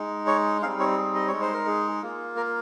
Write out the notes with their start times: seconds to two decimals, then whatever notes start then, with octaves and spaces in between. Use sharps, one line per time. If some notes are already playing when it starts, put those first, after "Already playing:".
Already playing: G#3 D#4
0.27 C#5
0.62 G3 C4 D#4 F5
0.80 C#5
0.97 G#4
1.15 D#5
1.28 C#5
1.33 G#3 D#4
1.41 C5
1.54 A#4
1.67 G#4
2.02 A#3 F4
2.37 A#4